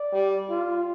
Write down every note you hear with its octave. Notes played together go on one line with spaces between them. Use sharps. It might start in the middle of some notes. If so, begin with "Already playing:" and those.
Already playing: D5
G3
F4